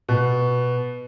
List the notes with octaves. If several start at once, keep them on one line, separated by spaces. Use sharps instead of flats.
B2